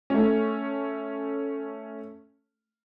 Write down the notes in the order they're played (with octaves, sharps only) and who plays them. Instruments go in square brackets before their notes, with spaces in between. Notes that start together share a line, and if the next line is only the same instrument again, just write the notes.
[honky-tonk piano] A3 C#4